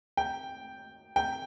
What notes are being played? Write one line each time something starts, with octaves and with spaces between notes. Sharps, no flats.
G5
G5